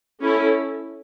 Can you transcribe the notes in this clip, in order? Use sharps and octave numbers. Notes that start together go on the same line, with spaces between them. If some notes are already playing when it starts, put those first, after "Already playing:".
C#4 E4 A4